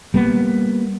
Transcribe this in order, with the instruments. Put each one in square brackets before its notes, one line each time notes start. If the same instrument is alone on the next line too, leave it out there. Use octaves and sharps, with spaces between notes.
[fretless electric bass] G3 A#3 B3